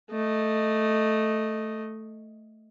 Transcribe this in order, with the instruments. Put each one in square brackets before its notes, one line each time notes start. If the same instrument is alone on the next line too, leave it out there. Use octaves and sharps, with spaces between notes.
[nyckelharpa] A3 D#5